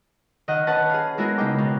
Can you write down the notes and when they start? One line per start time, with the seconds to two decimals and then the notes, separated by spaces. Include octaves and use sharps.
0.48 D#3 D#5 F#5
0.67 C#4 B4 F#5 A5
0.90 G#4 F5
1.18 G#3 B3 E4 F#4 G#4 A#4
1.38 C#3 G#3 D#4 G5 D6
1.58 B2